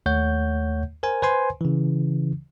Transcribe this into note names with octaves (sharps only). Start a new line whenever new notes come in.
D#2 A3 C#5 F#5 G6
A#4 C5 G#5
B4 C5 G#5 C6
C#3 E3